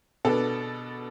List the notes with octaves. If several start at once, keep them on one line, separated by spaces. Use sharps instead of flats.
B2 B3 D4 A4